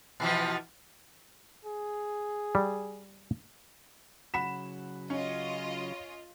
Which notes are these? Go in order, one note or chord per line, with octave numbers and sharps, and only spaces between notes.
B2 E3 F3
G#4
G3
C#3 F#3 F#5 B5 B6 E7
C#4 F4 D#5